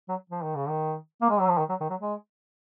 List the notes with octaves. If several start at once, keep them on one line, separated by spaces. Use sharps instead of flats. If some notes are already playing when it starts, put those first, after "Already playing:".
F#3
F3
D#3
C#3
D#3
A#3
G#3
F#3
F3
D#3
F#3
D#3
F#3
G#3